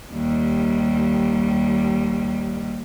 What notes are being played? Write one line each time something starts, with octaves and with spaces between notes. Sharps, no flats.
D#2 G3